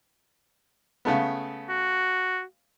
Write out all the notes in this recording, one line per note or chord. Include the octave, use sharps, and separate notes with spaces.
C#3 A3 B3
F#4